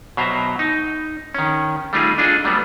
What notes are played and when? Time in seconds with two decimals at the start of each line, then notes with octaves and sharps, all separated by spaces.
0.17 B2 F#3 C5 E5 A#5
0.59 D#4
1.34 D#3 C#4
1.93 G3 A3 D#4 F4 G4 G#4
2.18 D4 F4 G#4 A4 D#5
2.44 F#3 G3 A3 B3